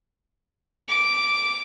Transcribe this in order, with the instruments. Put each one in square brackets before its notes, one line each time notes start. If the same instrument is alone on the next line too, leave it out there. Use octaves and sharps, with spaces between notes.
[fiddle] D6